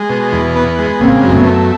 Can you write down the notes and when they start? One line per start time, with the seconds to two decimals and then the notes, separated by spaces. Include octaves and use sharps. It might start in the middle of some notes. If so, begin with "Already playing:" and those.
Already playing: G#3
0.10 B2
0.32 E2
0.56 B3
0.78 G#3
1.00 C#3 A#3 C4
1.24 F#2
1.31 A3 B3
1.46 A3